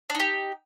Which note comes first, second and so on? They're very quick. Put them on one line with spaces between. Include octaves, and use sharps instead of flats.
D4 D#4 G4